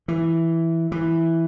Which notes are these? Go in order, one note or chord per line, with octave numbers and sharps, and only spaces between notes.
E3
E3